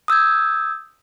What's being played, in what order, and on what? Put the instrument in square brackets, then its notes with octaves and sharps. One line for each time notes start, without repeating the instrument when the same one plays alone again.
[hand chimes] D#6 E6 G6 G#6